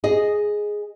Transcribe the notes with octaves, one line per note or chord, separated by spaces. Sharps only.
G#4 D#5